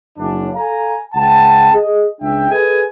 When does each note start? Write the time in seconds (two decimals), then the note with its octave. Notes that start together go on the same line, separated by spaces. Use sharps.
0.17 F#1 F#2 C#4 D4
0.54 A4 F5 G#5 A#5
1.14 C#2 F#5 G5 A5
1.73 G#4 D#5
2.21 C#2 D4 E5 G5
2.50 G#4 A4 B4 D#5 G#5